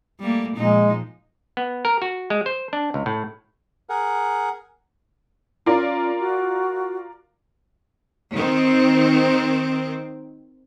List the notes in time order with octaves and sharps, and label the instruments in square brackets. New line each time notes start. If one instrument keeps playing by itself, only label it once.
[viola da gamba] G3 A3 A#3
[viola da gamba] A#2 F3 D#4 [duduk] G#3
[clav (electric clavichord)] B3
A#4
F#4
G#3
C5
D4
C#2
A2
[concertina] G#4 A#4 F#5
[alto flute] C#4 [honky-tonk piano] F4 A#4 D5
[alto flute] F#4
[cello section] D#3 C4